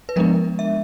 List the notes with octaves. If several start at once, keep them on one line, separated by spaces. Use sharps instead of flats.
B4
F3 G#3 B3 D4 A#4
E5